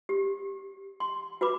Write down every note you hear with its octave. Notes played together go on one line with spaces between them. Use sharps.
G4
C6
F#4 B4 B5 D6